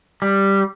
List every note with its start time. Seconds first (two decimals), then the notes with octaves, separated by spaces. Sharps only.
0.22 G3